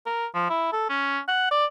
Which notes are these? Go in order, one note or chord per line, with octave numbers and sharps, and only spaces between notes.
A#4
F3
E4
A4
C#4
F#5
D5